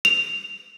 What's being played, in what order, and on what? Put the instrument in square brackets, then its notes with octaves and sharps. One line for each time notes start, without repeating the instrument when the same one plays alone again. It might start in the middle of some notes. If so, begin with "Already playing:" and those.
[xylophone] F7